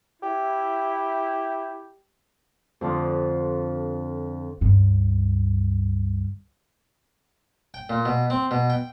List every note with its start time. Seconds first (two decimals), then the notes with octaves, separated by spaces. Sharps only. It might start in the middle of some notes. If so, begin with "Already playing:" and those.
0.22 E4 G4
2.81 F2 D3 F4 D#6
4.61 C#2 G2
7.74 G5
7.90 A#2
8.05 B2
8.30 C4
8.51 B2
8.70 G5